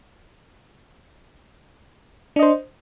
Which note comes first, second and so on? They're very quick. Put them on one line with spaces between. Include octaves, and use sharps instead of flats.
D4 D#5 C5